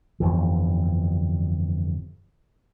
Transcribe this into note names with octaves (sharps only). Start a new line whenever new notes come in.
G1 F2 E3